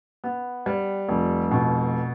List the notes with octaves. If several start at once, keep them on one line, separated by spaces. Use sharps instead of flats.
B3
G3
F1
B2